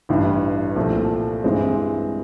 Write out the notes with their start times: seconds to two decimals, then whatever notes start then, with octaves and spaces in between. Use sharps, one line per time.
0.09 A1 G2 E3
0.76 C2 A#2 F3 A3
1.44 G2 E3 G#3 C4